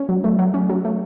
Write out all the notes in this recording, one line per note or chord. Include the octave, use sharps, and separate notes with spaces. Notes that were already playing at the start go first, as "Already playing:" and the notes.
Already playing: C#4
F#3
A3
F#3
C#4
F#3
A3